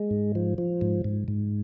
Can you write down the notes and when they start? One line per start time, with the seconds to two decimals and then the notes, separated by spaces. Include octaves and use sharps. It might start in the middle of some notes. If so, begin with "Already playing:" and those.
Already playing: G#3
0.11 G#2
0.35 F3
0.58 F3
0.81 G#2
1.04 G#2
1.28 G#2